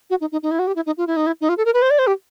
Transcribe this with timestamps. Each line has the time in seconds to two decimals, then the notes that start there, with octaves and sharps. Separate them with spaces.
0.10 F#4
0.21 D#4
0.32 D#4
0.43 D#4
0.51 E4
0.59 F#4
0.67 G4
0.76 E4
0.86 D#4
0.98 F4
1.07 E4
1.17 D#4
1.27 E4
1.41 D#4
1.49 F4
1.58 A4
1.65 A#4
1.74 B4
1.82 C5
1.90 D5
1.99 C5
2.07 G4